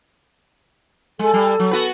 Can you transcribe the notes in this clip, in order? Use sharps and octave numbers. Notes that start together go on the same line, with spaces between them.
G#3 A4
G3
F#3
B3 F#4 B4